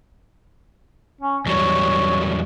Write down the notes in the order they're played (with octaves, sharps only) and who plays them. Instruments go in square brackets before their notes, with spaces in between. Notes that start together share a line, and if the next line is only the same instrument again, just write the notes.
[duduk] C#4
[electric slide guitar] E2 F#3 G3 [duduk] C#5